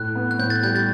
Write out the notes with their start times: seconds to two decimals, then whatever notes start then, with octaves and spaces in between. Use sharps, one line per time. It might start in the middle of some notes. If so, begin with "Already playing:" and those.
Already playing: A2 F#6
0.15 B3
0.31 F#6
0.39 A2 G6
0.50 A6
0.63 G3 G6
0.76 A6